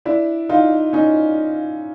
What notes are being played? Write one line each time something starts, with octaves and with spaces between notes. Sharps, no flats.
D4 E4
D#4 F4
C#4 D#4